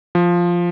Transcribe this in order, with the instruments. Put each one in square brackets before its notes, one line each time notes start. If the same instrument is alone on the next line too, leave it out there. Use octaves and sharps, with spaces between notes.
[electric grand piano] F3